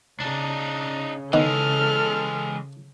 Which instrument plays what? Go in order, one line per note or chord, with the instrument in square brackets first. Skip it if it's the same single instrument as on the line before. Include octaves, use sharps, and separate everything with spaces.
[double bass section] C#3 [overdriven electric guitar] D4 D#4
[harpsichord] D#3 B3 [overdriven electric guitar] E3 G#3 [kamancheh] A4 F6